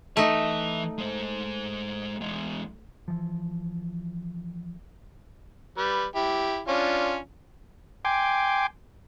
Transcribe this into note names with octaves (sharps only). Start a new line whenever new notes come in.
E3 A3 D#4 E5
G#3 C5
E2 G#3
E3 F3
G3 B4
E4 G4
C#4 D4 F4
G5 G#5 C6 D6